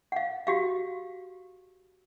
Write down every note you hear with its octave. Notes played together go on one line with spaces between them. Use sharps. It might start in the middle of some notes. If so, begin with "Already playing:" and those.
F5 F#5
F#4 G4 F5